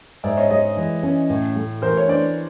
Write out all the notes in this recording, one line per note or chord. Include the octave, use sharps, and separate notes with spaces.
G#2 D5 E5
C#5 D#5
G#3 C#5 D#5
E3
C#4
A2
A3
E3 A#4 C5
C#5
D4 C5 D5